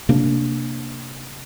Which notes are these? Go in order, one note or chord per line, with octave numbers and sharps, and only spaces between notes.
C3 A#3 D4